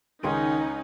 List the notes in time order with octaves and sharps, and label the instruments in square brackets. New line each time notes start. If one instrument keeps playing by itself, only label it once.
[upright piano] C#2 G#4 C6 [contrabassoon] D#3 [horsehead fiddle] C#4 [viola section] D#4